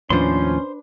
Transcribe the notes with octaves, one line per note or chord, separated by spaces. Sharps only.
D#2 A2 F3 C#4 D4 B4 C5 C6